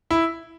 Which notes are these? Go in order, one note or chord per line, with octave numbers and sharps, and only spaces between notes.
E4